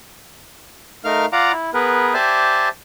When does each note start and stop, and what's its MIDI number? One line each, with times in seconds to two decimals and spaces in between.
1.04 1.26 57
1.04 1.26 63
1.04 1.26 70
1.04 1.26 77
1.04 1.26 89
1.33 1.52 65
1.33 1.52 74
1.33 1.52 77
1.33 1.52 78
1.33 1.52 82
1.33 1.52 86
1.53 1.71 64
1.74 2.14 59
1.74 2.14 68
1.74 2.14 70
1.74 2.14 71
2.14 2.69 67
2.14 2.69 72
2.14 2.69 74
2.14 2.69 76
2.14 2.69 80
2.14 2.69 81